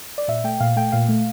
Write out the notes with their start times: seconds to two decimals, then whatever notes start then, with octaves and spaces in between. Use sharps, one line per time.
0.18 D5
0.28 A#2 E5
0.44 A3 G5
0.60 A#2 F5
0.76 A3 G5
0.92 A#2 F5
1.09 A3